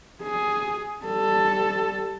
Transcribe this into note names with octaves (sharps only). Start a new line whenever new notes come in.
G#4
G3 A4